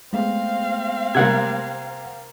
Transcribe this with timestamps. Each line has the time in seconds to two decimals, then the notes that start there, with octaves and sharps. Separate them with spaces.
0.13 G#3 A3 B3 C4 F5
1.15 C3 G3 A#3 F#5 G#6